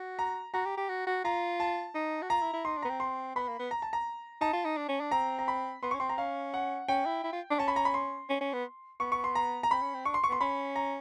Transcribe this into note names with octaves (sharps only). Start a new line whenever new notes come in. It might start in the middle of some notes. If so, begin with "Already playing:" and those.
Already playing: F#4
A#5
F#4 A#5
G4
G4
F#4
F#4
F4 A#5
A5
D#4
F#4
F4 A#5
E4
E4
D#4 C6
D4
B3 A#5
C4
C6
B3 B5
A#3
B3
A#5
A5
A#5
D#4 A5
F4
D#4
D4
C#4
D4
C4 A#5
A#5
B5
B3 C6
C#4 C#6
C4 C6
A#5
C#4 F5
F#5
C#4 G5
E4
E4
F4
D4
C#4 A5
B5
A#5
B5
C6
C#4
C#4
B3
B3 C#6
C#6
C6
A#5
A#5
C4 B5
C#4
C4
D4 C#6
C6
C#6
B3 C6
C#4 B5
A#5